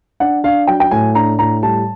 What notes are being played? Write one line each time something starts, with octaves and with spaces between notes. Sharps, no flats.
D4 F#5
D4 F5
F#3 G5
G5
A2 G#5
D4 A#5
A2 A#5
G3 A5